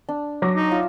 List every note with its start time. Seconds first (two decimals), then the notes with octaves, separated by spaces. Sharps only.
0.09 D4
0.42 F#3 D6 A#6
0.55 D#4
0.72 F4 E5